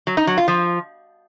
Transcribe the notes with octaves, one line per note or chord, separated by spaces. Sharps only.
F#3
D#4
F#3
F4
F3